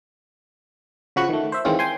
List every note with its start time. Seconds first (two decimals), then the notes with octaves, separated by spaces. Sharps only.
1.16 C#3 F3 F#4 B5 C#6 F#6
1.29 D#3 A3
1.52 C5 E5
1.65 D#3 E3 G#3 C4 C#4 F4
1.79 G5 G#5 C6